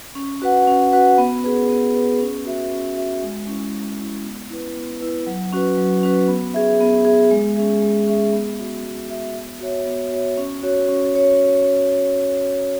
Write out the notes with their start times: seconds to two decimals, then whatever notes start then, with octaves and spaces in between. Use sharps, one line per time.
0.15 C#4
0.42 F#4 B4 F#5
0.67 C#4
0.93 F#4 B4 F#5
1.18 B3
1.44 G#4 B4
1.69 B3
1.95 G#4 B4
2.21 C#4
2.46 F#4 E5
2.71 C#4
2.97 F#4 E5
3.23 G#3
3.47 C#4 E4
3.74 G#3
3.99 C#4 E4
4.24 B3
4.50 E4 B4
4.75 B3
5.01 E4 B4
5.27 F#3
5.52 C#4 F#4 B4
5.77 F#3
6.03 C#4 F#4 B4
6.28 B3
6.54 G#4 E5
6.80 B3
7.05 G#4 E5
7.31 G#3
7.56 C#4 G#4 E5
7.82 G#3
8.08 C#4 G#4 E5
8.33 B3
8.59 F#4 E5
8.84 B3
9.10 F#4 E5
9.35 B3
9.60 F#4 C#5 E5
9.86 B3
10.11 F#4 C#5 E5
10.37 C#4
10.63 F#4 C#5
10.89 C#4
11.14 F#4 C#5